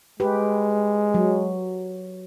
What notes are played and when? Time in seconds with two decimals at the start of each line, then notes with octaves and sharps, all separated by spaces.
0.20 G#3 G4 B4
1.14 F#3